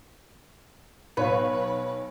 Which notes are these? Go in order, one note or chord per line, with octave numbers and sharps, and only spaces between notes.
B1 B4 C#5 F5